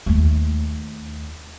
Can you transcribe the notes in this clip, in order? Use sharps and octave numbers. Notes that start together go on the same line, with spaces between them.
D#2 A3